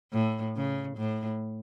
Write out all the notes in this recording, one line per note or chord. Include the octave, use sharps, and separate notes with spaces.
A2
C#3
A2